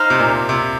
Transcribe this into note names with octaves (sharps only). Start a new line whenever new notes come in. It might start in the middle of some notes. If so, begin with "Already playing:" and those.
Already playing: D#4 C5 F5
C3
A#2
C3